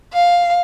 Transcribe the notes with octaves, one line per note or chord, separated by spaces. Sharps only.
F5